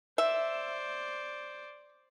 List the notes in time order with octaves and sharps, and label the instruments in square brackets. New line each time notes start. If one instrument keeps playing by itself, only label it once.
[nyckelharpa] C5 D5 [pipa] E5